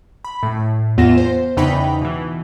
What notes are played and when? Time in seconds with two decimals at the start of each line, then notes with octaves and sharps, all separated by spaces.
0.25 B5
0.43 A2
0.98 E2 B3 F4 F#5 A#6 E7
1.18 C5
1.57 E2 C#3 D#4 G5 B5 B6
2.01 B2 E3